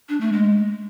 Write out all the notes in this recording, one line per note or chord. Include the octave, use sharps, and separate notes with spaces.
D4
A3
G#3